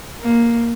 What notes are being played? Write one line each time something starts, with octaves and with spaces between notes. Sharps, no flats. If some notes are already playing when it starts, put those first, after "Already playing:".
A#3